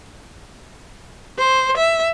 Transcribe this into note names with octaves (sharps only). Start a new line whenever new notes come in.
C5
E5